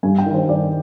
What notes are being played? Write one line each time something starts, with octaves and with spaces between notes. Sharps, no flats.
G2 G#5
G5
D#3
C5
G2 D5